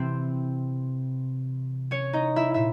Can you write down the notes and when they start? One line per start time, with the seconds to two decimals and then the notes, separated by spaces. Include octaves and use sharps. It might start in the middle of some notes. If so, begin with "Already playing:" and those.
Already playing: C3 E3 C4 C5
1.91 C#4 C#5
2.13 D#4 D#5
2.36 E4 E5
2.54 A#2 E5